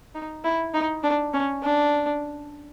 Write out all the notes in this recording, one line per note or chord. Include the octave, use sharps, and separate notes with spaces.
D#4
E4
D#4
D4
C#4
D4